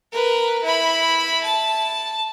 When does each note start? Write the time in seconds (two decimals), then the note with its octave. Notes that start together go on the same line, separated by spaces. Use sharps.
0.12 A#4 B4
0.63 E4 B5
1.43 A5